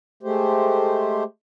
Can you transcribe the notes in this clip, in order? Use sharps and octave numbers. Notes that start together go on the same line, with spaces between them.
G#3 A3 G4 C5